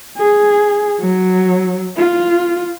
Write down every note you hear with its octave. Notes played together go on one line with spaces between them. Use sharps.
G#4
F#3
F4